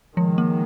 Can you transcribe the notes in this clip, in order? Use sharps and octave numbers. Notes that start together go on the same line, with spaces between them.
D#3 F3 G#3
A#3